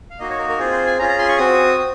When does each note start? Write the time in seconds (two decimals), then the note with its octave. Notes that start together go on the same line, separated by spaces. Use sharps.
0.10 F5
0.19 A#3 D#4 F#4 D#5
0.29 C#5
0.39 A#4
0.49 A#4
0.59 C4 F4 G#4 C5
0.72 C5
0.86 G#5
0.99 C#4 F4 G#4 A#5
1.09 A#5
1.19 C6
1.28 C#6
1.38 C4 F#4 D#6
1.78 C4